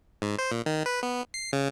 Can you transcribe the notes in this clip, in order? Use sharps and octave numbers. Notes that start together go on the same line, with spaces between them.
G#2
C5
A#2
D#3
B4
B3
C7
C#3